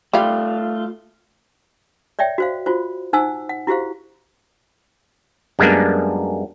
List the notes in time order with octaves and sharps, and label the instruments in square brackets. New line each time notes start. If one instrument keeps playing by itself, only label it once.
[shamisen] G3 F5 [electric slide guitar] A3 F4
[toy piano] C#5 D5 E5 G5
F#4 C5 F5
F4 F#4 C5
D#4 C5 F#5 G#5 E6
F#5
E4 F#4 G4 C5 F5
[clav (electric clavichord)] F#2 G3 G#3 A#3 B3 D4